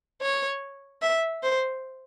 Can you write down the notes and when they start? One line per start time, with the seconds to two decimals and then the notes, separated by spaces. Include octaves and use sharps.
0.21 C#5
1.02 E5
1.43 C5